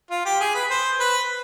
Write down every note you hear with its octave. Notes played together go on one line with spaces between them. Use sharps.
F4
G4
G#4
B4
C5
B4